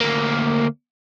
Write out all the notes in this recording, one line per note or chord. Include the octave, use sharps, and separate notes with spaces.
D2 A#3